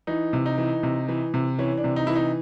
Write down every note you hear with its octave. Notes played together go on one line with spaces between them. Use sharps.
E3 D#4
C3
D#4
E3
C3
E3
C3
E3 C#4
D4
C3
D#4
E3 E4
D#4